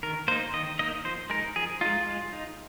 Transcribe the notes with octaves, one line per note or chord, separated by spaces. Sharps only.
D#3 A#4
A#3 D#4 C5
D#3 D#5
A#3 D#4 D#5
F3 C5
G#3 D#4 A#4
F3 G#4
G#3 D#4 F4
G#3
D#4